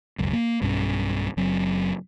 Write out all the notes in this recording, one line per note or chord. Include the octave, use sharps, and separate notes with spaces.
E1 C#2 F#2
A#3
B1 G2 B2 C#4
F#1 F#3 C4